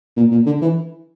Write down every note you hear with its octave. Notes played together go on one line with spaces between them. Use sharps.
A#2
A#2
D3
E3